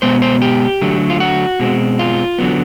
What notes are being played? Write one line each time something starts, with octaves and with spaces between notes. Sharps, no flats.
B2 G#3 B3 C5
C5
G4
D3 F#3 A3
F4
F#4
B2 G#3 C4
F4
D3 F#3 B3